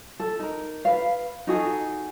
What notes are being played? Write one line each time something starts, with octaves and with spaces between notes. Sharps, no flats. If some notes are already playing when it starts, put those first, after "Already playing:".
A4
D#4 A#4
B4 F5
D#4 F#4 G#4 A4